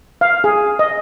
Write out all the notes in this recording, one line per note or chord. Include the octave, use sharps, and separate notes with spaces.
F5
G#4
D#5